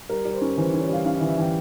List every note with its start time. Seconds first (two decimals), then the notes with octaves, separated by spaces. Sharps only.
0.10 G3 A#4
0.25 G3
0.33 C5
0.42 C#4
0.57 E3 C5
0.74 C#4
0.81 C#5
0.89 G3 F5
1.05 C#4 F5
1.17 E5
1.21 E3
1.29 E5
1.37 E3 G5